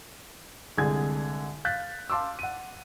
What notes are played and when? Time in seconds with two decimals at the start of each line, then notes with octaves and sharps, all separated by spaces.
0.78 C2 D3 G#3 G#4 G#6
1.65 F5 F#6 G6 A6 B6
2.10 F5 A5 C6 D6 E6
2.39 F#5 D#7